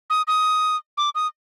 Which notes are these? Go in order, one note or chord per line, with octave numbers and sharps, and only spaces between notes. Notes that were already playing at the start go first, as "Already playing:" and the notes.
D#6
D#6
D6
D#6